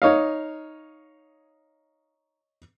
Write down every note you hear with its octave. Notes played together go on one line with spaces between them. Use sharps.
D#4 C#5 D#5 F5